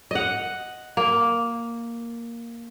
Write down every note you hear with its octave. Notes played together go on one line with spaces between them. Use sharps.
D#5 F#5
A#3